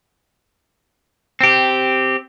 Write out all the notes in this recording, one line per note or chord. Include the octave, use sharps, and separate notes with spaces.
C4 G4